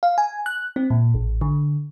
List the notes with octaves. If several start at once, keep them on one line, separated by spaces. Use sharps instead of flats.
F5
G#5
F#6
C4
A#2
A1
D3